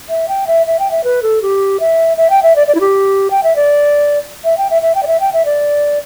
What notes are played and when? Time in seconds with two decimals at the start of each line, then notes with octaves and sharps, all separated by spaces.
0.09 E5
0.28 G5
0.47 E5
0.66 E5
0.79 G5
0.91 E5
1.04 B4
1.23 A4
1.42 G4
1.80 E5
2.17 E5
2.30 G5
2.43 E5
2.56 D5
2.67 D5
2.75 E4
2.81 G4
3.31 G5
3.43 E5
3.56 D5
4.44 E5
4.58 G5
4.70 E5
4.82 E5
4.95 G5
5.03 D5
5.07 E5
5.20 G5
5.33 E5
5.45 D5